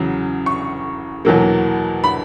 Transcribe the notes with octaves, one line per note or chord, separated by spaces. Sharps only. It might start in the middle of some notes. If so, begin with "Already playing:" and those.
Already playing: E2 C#3 F#3
C#6
E2 B2 F#3 A#3
B5